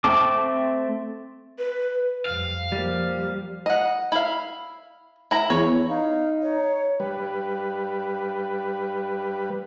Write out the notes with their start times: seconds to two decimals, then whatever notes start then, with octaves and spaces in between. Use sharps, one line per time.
0.04 A3 C4 A5 D6
1.59 B4
2.26 F2 G3 F5
2.72 F3 G3 A#3
3.66 D#5 F#5
4.12 E4 F5
5.31 E4 A#5
5.50 E2 C#5
5.89 D#4 F5
6.42 C#5
7.00 G3 B4